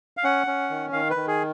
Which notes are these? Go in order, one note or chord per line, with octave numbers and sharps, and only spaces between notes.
F5
C#4 F#5
C#4
D#3
D#3 F5
B4
D#3
G#4